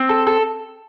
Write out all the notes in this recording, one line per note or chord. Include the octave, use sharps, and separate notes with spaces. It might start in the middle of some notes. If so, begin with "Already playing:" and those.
Already playing: C4
A4
A4